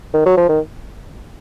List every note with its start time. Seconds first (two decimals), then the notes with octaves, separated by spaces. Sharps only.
0.14 D#3
0.26 F#3
0.37 F3
0.49 D#3